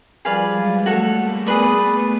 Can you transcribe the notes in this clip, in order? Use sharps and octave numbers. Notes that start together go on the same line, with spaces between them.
F3 G3 G#4 B4 D5 F5
F#3 G#3
G3 A3 F#4 A4 C#5
G#3 A#3
A3 B3 G#4 B4 D5